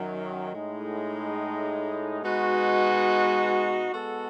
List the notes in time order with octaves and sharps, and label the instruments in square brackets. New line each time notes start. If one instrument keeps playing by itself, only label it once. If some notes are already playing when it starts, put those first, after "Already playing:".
Already playing: [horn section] F#2 D#3 F#3
A2 G#3 D#4
B2 G#3 D#4 F#4 B4
G#3 B3 F#4 A4